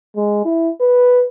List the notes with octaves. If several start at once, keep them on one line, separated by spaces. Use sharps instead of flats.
G#3
E4
B4